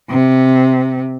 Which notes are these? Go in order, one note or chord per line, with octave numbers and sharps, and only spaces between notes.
C3